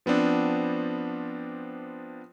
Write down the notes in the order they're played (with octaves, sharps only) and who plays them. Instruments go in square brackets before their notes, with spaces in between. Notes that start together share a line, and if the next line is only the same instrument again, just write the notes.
[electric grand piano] F3 B3 C4 D4